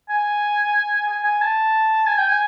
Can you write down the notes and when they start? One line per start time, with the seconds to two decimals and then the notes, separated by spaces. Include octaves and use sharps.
0.10 G#5
1.08 G#5
1.25 G#5
1.41 A5
2.07 G#5
2.18 G5
2.28 G#5